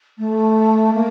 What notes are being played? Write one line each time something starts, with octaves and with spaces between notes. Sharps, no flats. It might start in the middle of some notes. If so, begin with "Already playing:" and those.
A3
A#3